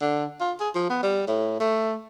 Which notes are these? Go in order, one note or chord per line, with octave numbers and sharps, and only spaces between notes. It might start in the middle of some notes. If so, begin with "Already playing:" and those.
D3
F4
G#4
F3
B3
G3
A2
A3